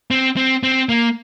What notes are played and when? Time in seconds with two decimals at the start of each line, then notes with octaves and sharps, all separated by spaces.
0.11 C4
0.37 C4
0.63 C4
0.89 A#3